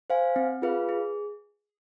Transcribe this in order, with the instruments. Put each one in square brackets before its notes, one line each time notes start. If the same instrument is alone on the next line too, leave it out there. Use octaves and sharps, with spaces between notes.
[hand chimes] C5 F5 G#5
C4
F4 G#4 B4 F5
G#4